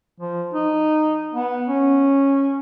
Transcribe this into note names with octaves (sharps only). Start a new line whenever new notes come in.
F3
D#4
B3
C#4